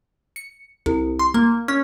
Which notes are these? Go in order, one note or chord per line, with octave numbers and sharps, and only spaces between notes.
C#7
C2
C6
A#3
C#4